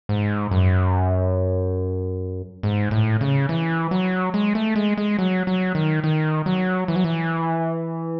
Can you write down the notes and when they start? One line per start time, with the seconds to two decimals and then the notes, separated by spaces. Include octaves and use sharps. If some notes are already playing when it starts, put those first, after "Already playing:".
0.09 G#2
0.51 F#2
2.63 G#2
2.91 A2
3.21 C#3
3.49 E3
3.91 F#3
4.34 G#3
4.55 A3
4.76 G#3
4.98 G#3
5.19 F#3
5.47 F#3
5.75 D#3
6.04 D#3
6.46 F#3
6.88 E3
6.96 F#3
7.04 E3